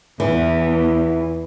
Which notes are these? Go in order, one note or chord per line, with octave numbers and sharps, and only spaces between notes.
E2 E3